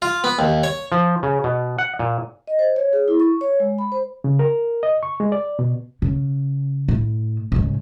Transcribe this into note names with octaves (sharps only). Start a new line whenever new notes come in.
F4
B3
D#2
C#5
F3
C#3
B2
F#5
A#2
D#5
C5
C#5
G#4
E4
C#6
C#5
G#3
B5
C5
C#3
A#4
D#5
C#6
G#3
D5
B2
C#3
A2
G#2 C#3